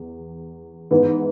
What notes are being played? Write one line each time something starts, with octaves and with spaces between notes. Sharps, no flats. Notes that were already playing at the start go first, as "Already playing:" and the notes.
Already playing: E2
G#2 E3 B3